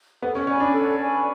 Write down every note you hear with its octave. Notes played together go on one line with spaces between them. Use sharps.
B3 A4
C#4
C#4 D5 G#5 B5
D4
A4
D5 G#5 B5